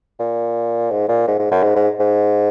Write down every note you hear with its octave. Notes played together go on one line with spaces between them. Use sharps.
A#2
G#2
A#2
G#2
G#2
F#2
G#2
G#2
G#2